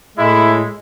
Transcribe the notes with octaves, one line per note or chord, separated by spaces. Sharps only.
A2 G#3 E4